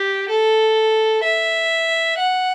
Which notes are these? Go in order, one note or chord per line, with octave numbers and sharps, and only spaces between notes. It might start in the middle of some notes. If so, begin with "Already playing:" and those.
Already playing: G4
A4
E5
F#5